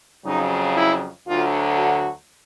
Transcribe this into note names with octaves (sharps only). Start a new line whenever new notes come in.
F2 C#3 F#3 D#4
E4
D2 D3 F#3 F4
F#4